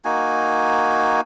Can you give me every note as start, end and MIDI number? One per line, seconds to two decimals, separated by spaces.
0.05 1.21 58
0.05 1.21 63
0.05 1.21 66
0.05 1.21 80